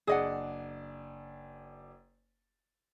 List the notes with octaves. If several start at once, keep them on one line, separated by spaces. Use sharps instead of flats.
F#1 D4 G#4 D5 D#5 F#5